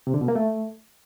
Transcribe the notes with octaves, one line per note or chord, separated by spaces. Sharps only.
C3
D3
B2
A#3
A3